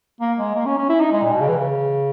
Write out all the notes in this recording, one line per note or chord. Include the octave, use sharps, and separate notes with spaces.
A#3
G#3
A#3
C#4
C#4
E4
D#4
G#3
A#2
B2
C#3
E3
C#3